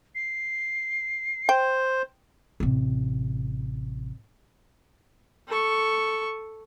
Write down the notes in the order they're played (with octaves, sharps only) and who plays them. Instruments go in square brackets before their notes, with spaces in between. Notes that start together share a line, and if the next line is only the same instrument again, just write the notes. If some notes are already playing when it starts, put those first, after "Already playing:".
[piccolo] C7
[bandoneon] C5 [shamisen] G5
[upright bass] A1 C3
[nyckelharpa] A4 C#6